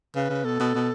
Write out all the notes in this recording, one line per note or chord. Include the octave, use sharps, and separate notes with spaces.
C#3 B4
C#3
B2 A4
B2
B2